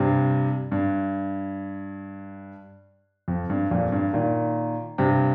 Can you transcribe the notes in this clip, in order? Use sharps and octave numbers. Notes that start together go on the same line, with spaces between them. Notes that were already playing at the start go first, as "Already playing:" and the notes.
Already playing: G2 C3
G2
F2
G2
F2 A#2
G2
A#2 D#3
G2 C3